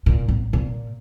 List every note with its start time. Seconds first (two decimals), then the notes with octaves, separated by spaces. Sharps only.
0.06 A#2
0.28 A1
0.53 A#2